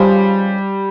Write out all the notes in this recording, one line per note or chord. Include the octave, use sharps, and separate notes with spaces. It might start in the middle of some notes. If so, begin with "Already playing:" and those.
Already playing: C#3 F3 G3 G#3